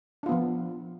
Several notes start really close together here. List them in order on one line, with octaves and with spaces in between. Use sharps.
D4 F4 B3 F3